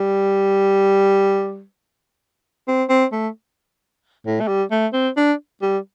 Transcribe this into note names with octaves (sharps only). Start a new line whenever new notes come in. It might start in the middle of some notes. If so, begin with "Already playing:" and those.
Already playing: G3
C4
C4
A3
A2
A3
G3
A3
C4
D4
G3